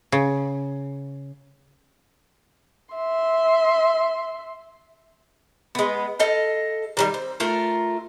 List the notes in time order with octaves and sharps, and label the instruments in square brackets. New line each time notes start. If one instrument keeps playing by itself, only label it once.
[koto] C#3
[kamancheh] E5 C6
[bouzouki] G#3 B3
A4 D#5 F5
D#3 F#3 G3
C4
A3 F4 A#4